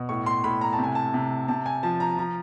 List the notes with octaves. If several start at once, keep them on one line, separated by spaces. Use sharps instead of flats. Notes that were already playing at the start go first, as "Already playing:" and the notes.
Already playing: B2
A2 C#6
C6
A2 B5
A#5
A5
C3
G#5
A5
C3
C3 A5
G#5
F3 A5
A#5
F3 A#5